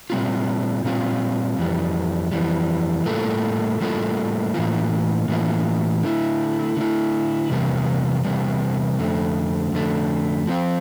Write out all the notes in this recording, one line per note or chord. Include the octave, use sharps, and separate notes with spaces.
A#2 G3 C4 F4
A#2 G3 C4 F4
F2 E3 G3
F2 E3 G3
A2 G3 A#3 F4 A4
A2 G3 A#3 F4 A4
A2 E3 A#3 F4
A2 E3 A#3 F4
D3 A3 E4
D3 A3 E4
E2 C3 G3 A#3
E2 C3 G3 A#3
F2 D3 A3
F2 D3 A3
F3 C4 F4